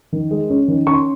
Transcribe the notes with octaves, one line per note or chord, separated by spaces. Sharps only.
D#3
G#3
C#4
D#3
C#4 C#6
C6